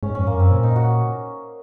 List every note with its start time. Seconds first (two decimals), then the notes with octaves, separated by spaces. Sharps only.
0.03 G#2 C#4
0.15 F2 C#4
0.27 A#3
0.35 F#2 C4
0.51 A#2 C#4
0.63 D#4
0.76 F#4